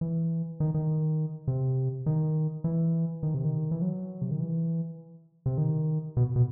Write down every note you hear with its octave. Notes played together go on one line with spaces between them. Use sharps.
E3
D#3
D#3
C3
D#3
E3
D#3
C3
D#3
E3
F#3
C3
D#3
E3
C3
D#3
B2
B2